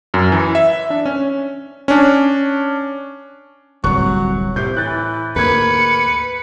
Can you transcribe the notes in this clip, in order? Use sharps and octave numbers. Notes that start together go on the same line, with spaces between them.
F#2
E3
E5
D4
C#4
C#4 D4
D1 C2 F#3 C#6 F#6
A2 C3 G6
E3 F#6 A6
D2 G#2 A#3 B4 G#6 C#7